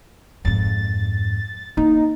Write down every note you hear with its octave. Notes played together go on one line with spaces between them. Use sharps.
F2 G#2 A6
A#3 D#4 E4